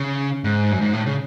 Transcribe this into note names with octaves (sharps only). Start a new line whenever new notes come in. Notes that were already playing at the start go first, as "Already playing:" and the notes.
Already playing: C#3
G#2
F#2
G#2
A2
C#3